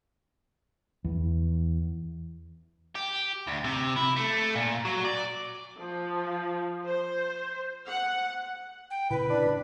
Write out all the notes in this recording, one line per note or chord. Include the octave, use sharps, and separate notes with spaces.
E2
G4
D2
C3
E4
A3
A#2
F#3
D5
F3
C5
F#5
G5
A#2 C#3 E4 B4
D4